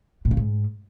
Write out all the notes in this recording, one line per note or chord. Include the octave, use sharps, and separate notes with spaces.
A2
C#3
G#2